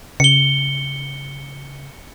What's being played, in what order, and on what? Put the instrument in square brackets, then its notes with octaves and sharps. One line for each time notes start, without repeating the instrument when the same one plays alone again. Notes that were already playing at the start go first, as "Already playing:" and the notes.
[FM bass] C#3 [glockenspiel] C#7 G7